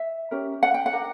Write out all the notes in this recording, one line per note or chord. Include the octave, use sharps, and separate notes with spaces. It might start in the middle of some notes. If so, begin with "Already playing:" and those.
Already playing: E5
C#4 G4 A#4
F#5
G5
F#5
D4 A#4